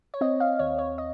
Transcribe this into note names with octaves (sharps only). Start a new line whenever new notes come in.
C#5
C4 D#5
F5
D#2 C#5
C#5
D#5